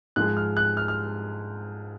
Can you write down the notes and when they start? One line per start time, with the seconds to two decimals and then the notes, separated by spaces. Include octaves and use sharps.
0.16 G#2 F3 G#3 F#6
0.37 F6
0.57 F#6
0.77 F6
0.88 F6